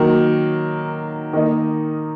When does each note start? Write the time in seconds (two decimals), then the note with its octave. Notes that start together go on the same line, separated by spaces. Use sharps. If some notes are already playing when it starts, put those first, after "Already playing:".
Already playing: D#3 F#3 A#3
1.33 D#3 A#3 D#4